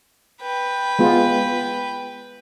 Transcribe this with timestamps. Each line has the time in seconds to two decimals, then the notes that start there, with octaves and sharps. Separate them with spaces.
0.42 B4 G5
0.99 G#3 B3 F4